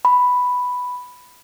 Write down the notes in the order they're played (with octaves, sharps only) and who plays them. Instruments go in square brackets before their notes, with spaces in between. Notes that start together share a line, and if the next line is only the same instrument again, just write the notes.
[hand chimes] B5